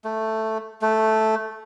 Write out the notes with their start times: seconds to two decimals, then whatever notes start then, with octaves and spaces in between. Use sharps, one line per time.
0.04 A3
0.82 A3